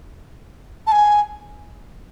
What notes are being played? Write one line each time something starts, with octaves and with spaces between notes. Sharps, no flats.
A5
G#5